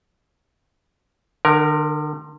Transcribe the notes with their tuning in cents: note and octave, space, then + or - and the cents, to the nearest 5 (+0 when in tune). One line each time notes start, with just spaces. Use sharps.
D3 +40 A#4 +10